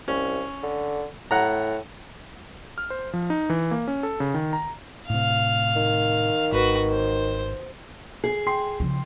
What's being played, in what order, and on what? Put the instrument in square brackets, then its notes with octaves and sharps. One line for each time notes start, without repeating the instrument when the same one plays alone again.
[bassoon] C2 [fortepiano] C#4
[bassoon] D3
[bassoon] A2 [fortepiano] F#5 A#5
[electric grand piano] F6
C5
F3
D#4
E3
A#3
C#4
A4
C#3
D#3
A#5
[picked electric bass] A2 C3 [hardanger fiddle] F5
[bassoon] D#3
[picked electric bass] G#1 [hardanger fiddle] F#4 B4
[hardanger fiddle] C5
[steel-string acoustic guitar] G#4
[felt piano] G5 C6 C7
[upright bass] C#3 F3